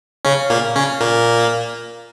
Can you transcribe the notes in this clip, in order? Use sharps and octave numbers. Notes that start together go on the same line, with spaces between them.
C#3 C#4
A#2 A#3
C#3 C#4
A#2 A#3